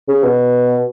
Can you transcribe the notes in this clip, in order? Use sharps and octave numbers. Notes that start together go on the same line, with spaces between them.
C#3
B2